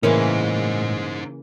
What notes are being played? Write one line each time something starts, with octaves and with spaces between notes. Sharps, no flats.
A2 C#3 E3 A#3 C#4 D#4 A#4 C5